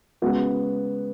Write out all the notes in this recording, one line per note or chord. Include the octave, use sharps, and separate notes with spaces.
C#3 G#3 B3 F#4